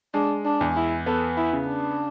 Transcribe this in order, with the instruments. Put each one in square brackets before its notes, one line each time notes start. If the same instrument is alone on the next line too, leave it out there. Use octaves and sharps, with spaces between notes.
[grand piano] G#3 [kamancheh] D4
[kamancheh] D4
[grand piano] E2
[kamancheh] E4
[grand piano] B3 [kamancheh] A4
[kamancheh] E4
[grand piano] C#3
[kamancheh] D4